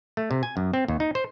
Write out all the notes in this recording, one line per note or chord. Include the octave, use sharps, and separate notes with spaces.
A3
C3
G#5
F#2
C4
D#2
D#4
C5